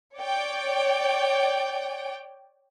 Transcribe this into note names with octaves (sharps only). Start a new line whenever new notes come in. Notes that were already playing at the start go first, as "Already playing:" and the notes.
C#5 D5 G5